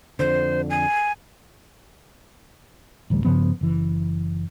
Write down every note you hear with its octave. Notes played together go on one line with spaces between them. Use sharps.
F2 D3 C5
G#5
A1 D2 G3
G2 C#3 F3 B3
F#1 E3